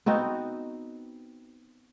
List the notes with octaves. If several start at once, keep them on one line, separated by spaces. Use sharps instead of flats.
B3 C4 D#4 F#4